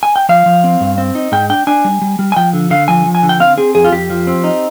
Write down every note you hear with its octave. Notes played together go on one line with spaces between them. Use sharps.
G#5
G5
F3 F5
F3
C4
G2
C4
D#4
G#2 G5
D4 G5
D4 G#5
G3
G3
G3
G#5
F3 G5
D3
D3 F5
F3 G#5
F3
G#5
D3
G5
C4 F5
C4 G#4
F2 G#4
F4
F2 G4
F3
C4
D#4